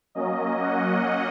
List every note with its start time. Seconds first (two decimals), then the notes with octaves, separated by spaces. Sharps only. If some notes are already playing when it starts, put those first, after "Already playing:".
0.15 F#3 A#3 C#4 D#5
0.63 F#5